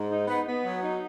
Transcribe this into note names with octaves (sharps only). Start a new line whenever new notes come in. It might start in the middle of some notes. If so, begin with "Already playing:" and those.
Already playing: G#2
D#4
B3
B3
F#3
D#4